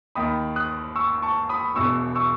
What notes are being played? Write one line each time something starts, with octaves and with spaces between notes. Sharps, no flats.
D#2 D#3 B5 D#6
D#6 F#6
C#6 E6
A5 C#6
B5 D#6
E1 E2 B2 C#6 E6
C#6 E6